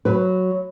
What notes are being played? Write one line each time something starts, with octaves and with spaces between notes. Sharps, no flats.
F#3 B4